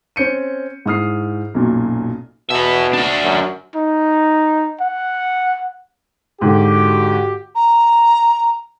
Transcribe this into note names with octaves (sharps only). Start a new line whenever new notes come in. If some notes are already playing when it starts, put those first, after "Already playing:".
C4 C#4 G6 C#7 D#7
G#2 E4 D#6 F6 C7
B1 F#2 A#2
B2 B3 E5
D4 F#4
F#2
D#4
F#5
G#2 D3 F#4 G4
A#5